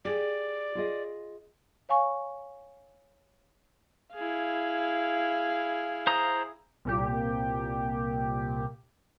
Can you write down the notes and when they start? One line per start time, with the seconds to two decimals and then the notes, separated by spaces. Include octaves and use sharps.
0.05 G4 G#4 D5
0.75 F4 G#4 D#5
1.89 C#5 F5 G#5 C#6
4.15 E4 G#4 F5
6.07 C5 A#5 D#6
6.85 C2 A#2 G4